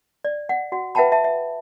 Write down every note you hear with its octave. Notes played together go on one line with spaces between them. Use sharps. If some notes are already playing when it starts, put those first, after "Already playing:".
D5
F#5
F#4 F#5
B4 E5 F#5 G5 A5 B5
E5 A5
E5